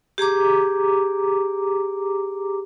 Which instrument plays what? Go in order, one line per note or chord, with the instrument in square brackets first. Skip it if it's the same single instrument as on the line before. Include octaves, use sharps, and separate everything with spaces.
[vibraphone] G4 G#4 A#5 D6